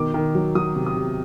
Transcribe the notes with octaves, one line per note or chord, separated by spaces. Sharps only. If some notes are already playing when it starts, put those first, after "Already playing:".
Already playing: B2 D#3 D6
D#3
F#3
F#3 D#6
C3
D#6
C3